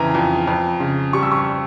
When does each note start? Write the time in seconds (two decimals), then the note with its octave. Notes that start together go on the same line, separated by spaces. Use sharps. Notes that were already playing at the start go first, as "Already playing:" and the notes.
Already playing: F2 C#3 E3 G#5 A#5
0.15 F2
0.47 F2
0.80 C#3
1.13 G3 C#6
1.23 E6
1.32 C#6